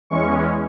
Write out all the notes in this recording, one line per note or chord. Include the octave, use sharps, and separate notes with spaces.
E2 E3 G#3 C#4 C#6